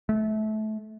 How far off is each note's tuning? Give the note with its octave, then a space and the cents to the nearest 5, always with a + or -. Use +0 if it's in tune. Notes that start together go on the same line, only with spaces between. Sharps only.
A3 -25